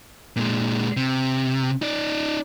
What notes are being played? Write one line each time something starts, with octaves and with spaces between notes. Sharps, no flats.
A#2 G#3
C3
D#4 D5